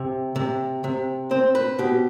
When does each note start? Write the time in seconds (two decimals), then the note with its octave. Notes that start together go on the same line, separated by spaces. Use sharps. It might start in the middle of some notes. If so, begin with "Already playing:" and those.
Already playing: C3
0.36 C3
0.84 C3
1.31 C4 C5
1.55 B4
1.79 B2 G4